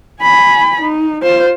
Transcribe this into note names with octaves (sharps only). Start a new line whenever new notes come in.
G#5 B5
D#4
F4 C5